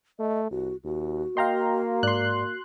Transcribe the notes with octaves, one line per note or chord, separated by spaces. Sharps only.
A3 D#5
C2 F#4
D#2 F#4
A#3 D#5 F5 G5 A#5 C6
G#2 D5 C6 F#6